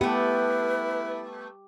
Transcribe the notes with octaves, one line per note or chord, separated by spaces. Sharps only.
A3 B3 E4 G4 B4